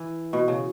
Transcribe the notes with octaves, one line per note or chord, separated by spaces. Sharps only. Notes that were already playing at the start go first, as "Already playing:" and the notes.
Already playing: E3
B2
C#3